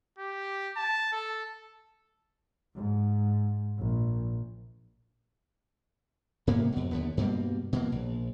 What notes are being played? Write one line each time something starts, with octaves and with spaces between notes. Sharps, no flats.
G4
A5
A4
G#2
A#1
G#2 C3 A#3 B3
F2 B2
D#2 D3 B3
G2 B2 G3 A#3
B2 E3 A#3
A#1